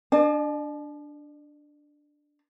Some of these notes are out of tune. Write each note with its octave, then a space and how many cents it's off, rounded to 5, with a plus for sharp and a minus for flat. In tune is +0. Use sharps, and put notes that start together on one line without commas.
D4 +0 D5 +45 A5 -35